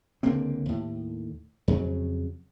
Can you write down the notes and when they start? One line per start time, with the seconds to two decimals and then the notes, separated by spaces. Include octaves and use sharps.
0.23 C#2 D3 A#3 C4
0.66 D#2 A2
1.68 F2 C#3 F#3